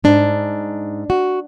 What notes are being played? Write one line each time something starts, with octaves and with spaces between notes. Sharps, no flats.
G#2 D4
F#4